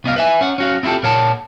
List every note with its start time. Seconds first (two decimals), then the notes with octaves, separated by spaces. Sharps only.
0.04 C2 B3 D#5 F5
0.16 B4 E5 G#5
0.41 C#4 F#5
0.58 C#4 F#4 F5
0.83 C4 E4 F4 G4 A4
1.03 A#2 A#4 C#5 F#5 A5